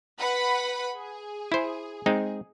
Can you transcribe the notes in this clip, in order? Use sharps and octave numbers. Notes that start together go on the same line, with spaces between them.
B4 F#5 B5
G#4
E4 C5
G#3 C4 D#4